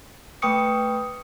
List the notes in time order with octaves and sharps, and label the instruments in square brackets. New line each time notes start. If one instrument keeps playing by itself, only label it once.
[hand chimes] A3 B4 G5 C#6 D#6 C#7